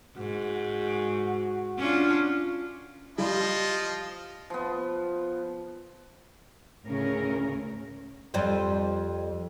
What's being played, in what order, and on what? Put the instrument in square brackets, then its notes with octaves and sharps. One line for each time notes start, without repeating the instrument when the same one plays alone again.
[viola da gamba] G#2 [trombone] F#4
[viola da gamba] C#4 D4 F4
[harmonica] F3 F4 D#5 [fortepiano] G3
[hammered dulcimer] F3 B3
[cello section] D2 A2 C#3 C#4 A#4
[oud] F2 G3 C5